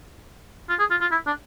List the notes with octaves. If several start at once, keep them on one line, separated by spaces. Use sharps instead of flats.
F4
G#4
F4
F4
E4
D4